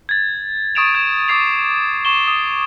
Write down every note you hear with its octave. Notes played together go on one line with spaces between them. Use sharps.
G#6 A6
C#6 D#6 A6 D7 E7 F7
G#6 E7
D6 D#6 A6 C7 F7
C#6 E7 G7
D#6